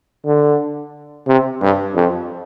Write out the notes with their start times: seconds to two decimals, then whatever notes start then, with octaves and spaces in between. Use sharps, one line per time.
0.25 D3
1.27 C3
1.62 G2
1.96 F2